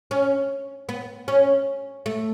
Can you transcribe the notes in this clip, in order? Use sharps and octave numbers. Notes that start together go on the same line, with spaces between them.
C#4
B3
C#4
A3